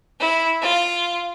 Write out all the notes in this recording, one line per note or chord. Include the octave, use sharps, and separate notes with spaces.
E4
F4